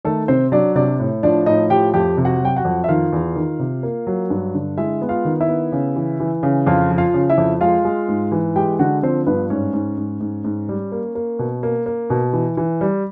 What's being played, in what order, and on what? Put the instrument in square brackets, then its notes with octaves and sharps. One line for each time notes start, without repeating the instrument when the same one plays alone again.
[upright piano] D#3 A3 A4
C3 C4 C5
F#3 D4 D5
C3 D4 D5
A2
F3 D4 D5
A2 D#4 D#5
F3 G4 G5
F2 G4 G5
C3
F#4 F#5
F#3 G5
F#4 F#5
F2
E5
D#3 F4 F5
E2
D#3
C3
A#3
F#3
G2
D3
G#3 E4 E5
B3
F4 F5
D#3
E4 E5
B3
C#3
E3
E3
C#3
F2 F4 F5
F3
F4 F5
C#3
E4 E5
F2
G#3 F4 F5
G#3
G#2
E3
G#3 G4 G5
D3 F#4 F#5
F3 C4 C5
G2 B3 B4
G#2 C#4 C#5
G#2
G#2
G#2
G#2
G3
A#3
A#3
B2
A#3
A#3
B2
E3
E3
G3